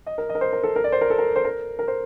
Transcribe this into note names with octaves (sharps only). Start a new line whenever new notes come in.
D#5
A#4
D#5
A#4
C5
A#4
A4
A#4
D5
C5
A#4
A4
A#4
C5
A#4
A#4
C5